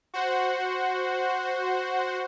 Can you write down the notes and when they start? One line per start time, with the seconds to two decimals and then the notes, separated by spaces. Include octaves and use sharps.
0.14 F#4 C5 F#5